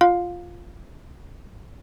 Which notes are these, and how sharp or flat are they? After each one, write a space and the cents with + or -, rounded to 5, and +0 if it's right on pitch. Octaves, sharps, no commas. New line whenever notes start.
F4 +0 F5 +20